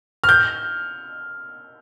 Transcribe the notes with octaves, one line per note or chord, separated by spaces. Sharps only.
F6
G6